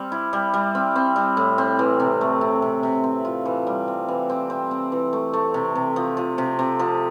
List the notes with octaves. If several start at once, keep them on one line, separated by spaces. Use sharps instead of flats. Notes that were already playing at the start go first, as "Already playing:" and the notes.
Already playing: G3 C4
E4
G3
G3
C4
C4
G3
A2
C4
E3
C3
A3
C3
C3
C3
C4
F4
E3
G3
C4
E3
C4
C4
C4
E3
A3
A3
C3
C3
F3
F3
C3
C3
F3